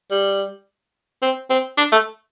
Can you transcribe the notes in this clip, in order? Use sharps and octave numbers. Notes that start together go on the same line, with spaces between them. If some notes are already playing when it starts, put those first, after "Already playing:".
G3
C4
C4
D4
A3